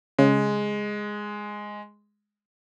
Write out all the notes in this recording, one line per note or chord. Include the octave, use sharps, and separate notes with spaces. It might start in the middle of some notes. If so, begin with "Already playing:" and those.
C#3 G#3